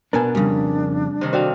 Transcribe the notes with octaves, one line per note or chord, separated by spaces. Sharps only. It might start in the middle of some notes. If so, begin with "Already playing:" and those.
B2 B3 D4 A#4 G#5
F2 C#3 G3 D4
C3 D#3
F#4 A4 C5 D5 F5 G5